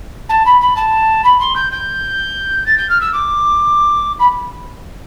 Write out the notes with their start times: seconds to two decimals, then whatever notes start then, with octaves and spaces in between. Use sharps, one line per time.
0.29 A5
0.45 B5
0.60 B5
0.76 A5
1.24 B5
1.39 C6
1.55 G6
1.71 G6
2.65 A6
2.77 G6
2.89 F6
3.00 E6
3.13 D6
4.19 B5